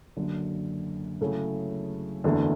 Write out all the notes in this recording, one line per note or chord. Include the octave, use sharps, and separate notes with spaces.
F#1 F#2 D3
C#3 F#3 A3 E4 G#4
F#1 E2 D3 A3